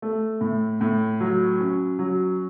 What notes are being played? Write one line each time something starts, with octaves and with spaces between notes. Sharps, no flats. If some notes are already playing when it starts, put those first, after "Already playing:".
A3
A2
A2
F#3
C#4
F#3